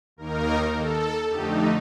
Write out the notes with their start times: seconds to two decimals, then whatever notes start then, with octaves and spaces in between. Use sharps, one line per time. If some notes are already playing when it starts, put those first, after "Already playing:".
0.17 D#2 D#3 A#3 D#4 A#4
0.74 A4
1.29 F2 D3 A3 D#4 G4